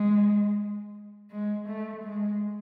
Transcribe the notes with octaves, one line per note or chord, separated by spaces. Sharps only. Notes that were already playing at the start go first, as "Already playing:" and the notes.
Already playing: G#3
G#3
A3
G#3